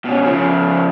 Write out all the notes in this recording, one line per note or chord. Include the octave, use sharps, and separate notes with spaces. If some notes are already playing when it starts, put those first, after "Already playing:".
B2 C#4
C#3 F3